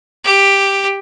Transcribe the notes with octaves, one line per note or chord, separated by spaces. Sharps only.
G4